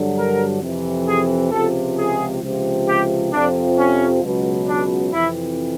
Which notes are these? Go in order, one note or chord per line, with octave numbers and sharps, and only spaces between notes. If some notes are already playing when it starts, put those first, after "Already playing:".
Already playing: G2 D3 F#3
A#4
F2 C3 E3
G#4
C#2 C3 F3 A4
G#4
C#2 C3 F3
G4
F2 C3 F3 D4
C#4
C#2 B2 F#3
D4
F2 C3 E3 E4